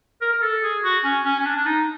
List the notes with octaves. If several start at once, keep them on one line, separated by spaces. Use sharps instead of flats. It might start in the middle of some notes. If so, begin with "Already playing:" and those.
A#4
A#4
A4
G#4
F#4
C#4
C#4
C#4
D4
D4
D#4